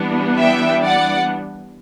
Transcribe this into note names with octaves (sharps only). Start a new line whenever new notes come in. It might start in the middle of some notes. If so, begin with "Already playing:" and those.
Already playing: E3 G3 B3 D4
E5 G5
D5 F#5